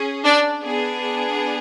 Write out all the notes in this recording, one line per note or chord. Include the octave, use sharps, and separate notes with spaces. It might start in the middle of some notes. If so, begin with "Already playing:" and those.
Already playing: C#4 G#4
D4 D5
B3 D4 G#4